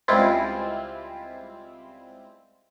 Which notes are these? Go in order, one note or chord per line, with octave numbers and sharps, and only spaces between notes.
C#2 G3 G#3 C4 E4 F4